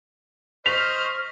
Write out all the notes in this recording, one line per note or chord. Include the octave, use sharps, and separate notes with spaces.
C5 D#5 C#6 F6 B6 F7